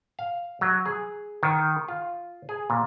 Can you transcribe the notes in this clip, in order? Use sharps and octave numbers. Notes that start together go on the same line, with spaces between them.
F5
F#3
G#4
D#3
F4
G#4
A#2